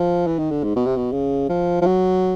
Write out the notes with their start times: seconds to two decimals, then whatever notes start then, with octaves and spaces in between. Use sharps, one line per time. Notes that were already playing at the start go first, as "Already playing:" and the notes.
Already playing: F3
0.27 E3
0.39 D#3
0.51 D3
0.63 G#2
0.76 B2
0.86 C3
0.97 B2
1.12 C#3
1.49 F3
1.81 F3
1.86 F#3